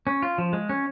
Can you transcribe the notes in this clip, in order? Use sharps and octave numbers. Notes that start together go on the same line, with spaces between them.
C#4
F4
F3
G#3
C#4